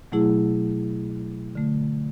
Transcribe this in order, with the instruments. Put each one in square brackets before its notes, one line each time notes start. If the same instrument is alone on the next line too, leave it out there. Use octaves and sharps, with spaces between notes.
[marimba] B2 F#3 A3 E4 G#4
D3 A3